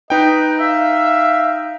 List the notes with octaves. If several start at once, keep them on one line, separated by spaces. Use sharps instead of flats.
D#4 B4 D#5 G5
E5 F5 E6